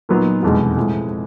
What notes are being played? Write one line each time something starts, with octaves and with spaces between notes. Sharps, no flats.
A#2 F#3 B3 D#4
F1 E2 B2 G#3
A2 F3 G#3